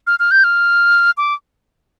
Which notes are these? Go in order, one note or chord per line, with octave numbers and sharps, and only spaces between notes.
F6
F6
G6
F6
D6